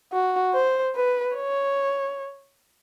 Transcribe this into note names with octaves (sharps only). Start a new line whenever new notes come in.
F#4
C5
B4
C#5